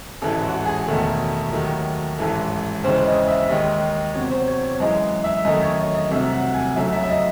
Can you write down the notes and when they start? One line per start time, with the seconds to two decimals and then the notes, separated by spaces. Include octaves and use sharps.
0.22 A1 G#2 E3 G#3 A4
0.43 F#4
0.65 G#4
0.88 E1 E2 D#3 A3
1.53 D#2 D#3 F#3 A3
2.18 A1 G#2 E3 A4
2.84 D#2 C#3 E3 G#3 C5
3.06 D#5
3.28 E5
3.49 D#2 D#3 G#3 D#5
4.15 E2 C3 F#3 C#5
4.30 C5
4.47 C#5
4.63 C#5
4.80 F#2 E3 G#3 D#5
5.24 E5
5.45 F#2 D#3 A3 D#5
5.62 C#5
5.78 D#5
5.94 D#5
6.11 C2 C3 F#3 A3 E5
6.33 F#5
6.54 G#5
6.76 F#2 C#3 F#3 A3 E5
6.92 E5
7.03 E5
7.09 D#5